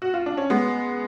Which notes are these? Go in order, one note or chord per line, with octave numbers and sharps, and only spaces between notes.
F#4
F4
D4
C#4
G#3 B3